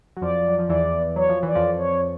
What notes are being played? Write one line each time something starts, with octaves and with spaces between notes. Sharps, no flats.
F#3
F2 F3 D5
F#3
F3
E2 E3 D5
F#3 C#5
F3
E3
D5
F2 F3
C#5